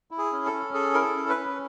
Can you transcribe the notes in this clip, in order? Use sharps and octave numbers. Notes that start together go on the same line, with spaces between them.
E4
G#4
C#4
A4
C#4
G#4 A4
E4 A#4
A4
C#4
B4
C#4